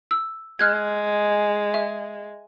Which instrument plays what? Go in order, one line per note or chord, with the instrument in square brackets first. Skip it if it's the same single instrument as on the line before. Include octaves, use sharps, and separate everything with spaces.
[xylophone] E6
[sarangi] G#3 [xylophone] F6 F#6 G#6
[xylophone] E5